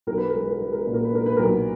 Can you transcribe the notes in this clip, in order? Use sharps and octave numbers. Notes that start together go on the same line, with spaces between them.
B1 A#4
B4
G#3 A#4
B4
A#4
G#3 B4
A#4
A#2 B4
A#4
B4
D4 A#4
B4
B1 A#4